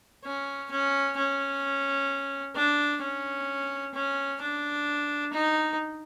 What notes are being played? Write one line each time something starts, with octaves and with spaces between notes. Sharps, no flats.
C#4
C#4
C#4
D4
C#4
C#4
D4
D#4